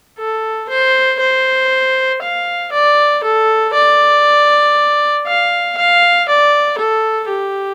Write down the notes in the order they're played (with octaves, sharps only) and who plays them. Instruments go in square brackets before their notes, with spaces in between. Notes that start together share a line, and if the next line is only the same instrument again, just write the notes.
[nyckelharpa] A4
C5
C5
F5
D5
A4
D5
F5
F5
D5
A4
G4